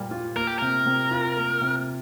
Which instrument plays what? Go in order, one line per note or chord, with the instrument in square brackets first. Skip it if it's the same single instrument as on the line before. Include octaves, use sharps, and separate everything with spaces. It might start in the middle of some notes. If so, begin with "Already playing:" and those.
Already playing: [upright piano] A#2 G3 A#3
F4
[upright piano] A#3 [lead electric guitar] A#4
[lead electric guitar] G4
[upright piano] C3 [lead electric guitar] A#4
[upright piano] C3
F4
A#3
C3